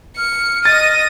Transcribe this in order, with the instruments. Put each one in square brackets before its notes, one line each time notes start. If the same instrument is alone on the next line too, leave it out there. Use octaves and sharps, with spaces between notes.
[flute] F6 [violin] C#7
[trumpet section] D#5 [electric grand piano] A6 [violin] A#6 D#7